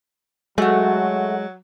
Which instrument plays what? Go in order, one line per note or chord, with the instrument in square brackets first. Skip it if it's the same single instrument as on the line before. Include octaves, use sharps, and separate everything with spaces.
[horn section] F#3 [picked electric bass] G#3 [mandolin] A3 F#4